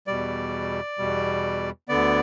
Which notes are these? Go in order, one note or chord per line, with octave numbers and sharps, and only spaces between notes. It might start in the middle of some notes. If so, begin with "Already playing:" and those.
E2 B2 G3 D5
E2 B2 G3
D2 D3 B3 D5